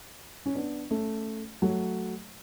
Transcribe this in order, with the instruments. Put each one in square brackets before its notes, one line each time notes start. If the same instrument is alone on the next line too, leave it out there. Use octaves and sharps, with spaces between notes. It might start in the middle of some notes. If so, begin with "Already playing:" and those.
[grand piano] C#4
B3 D4
A3 C#4
F#3 A3